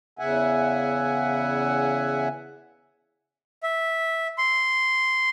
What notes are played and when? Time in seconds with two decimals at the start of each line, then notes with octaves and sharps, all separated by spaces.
0.19 E2 C#3 E5 F#5 G#5
3.63 E5
4.38 C6